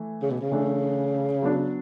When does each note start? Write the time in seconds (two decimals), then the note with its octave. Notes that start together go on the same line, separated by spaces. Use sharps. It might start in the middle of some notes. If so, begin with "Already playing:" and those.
Already playing: E3 A3
0.22 C#3
0.31 B2
0.41 C#3
0.51 E3 A3 D4
1.42 F#3 B3 D4